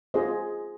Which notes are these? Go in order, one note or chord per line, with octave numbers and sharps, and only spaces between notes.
F4 G#4 C5 D#5